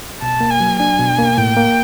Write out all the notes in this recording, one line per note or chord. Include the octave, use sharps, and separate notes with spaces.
B2 A5
A#3
G#5
F#3
D4 G#5
B2
A#3
A2 G5
A#3